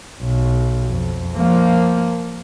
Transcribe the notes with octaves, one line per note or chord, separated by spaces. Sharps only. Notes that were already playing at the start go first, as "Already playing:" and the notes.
B1
F2
F3 A#3